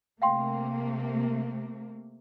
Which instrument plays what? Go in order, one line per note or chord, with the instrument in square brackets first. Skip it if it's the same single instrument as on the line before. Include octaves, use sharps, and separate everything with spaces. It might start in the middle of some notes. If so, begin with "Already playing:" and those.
[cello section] C3 A3 A#3 [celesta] F5 G5 C6